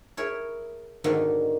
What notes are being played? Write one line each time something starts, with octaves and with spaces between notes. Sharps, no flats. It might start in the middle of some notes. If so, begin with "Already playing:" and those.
E4 G#4 A#4 C#5
G#2 B2 D3 D#3 A#3